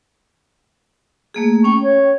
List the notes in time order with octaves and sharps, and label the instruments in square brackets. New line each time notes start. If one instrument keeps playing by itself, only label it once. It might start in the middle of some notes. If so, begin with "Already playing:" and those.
[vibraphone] A3 A#3 G#4
[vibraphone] C#4 G5 [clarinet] C#6
[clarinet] C#5